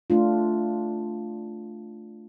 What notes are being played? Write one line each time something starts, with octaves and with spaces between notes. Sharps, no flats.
A3 D4 F4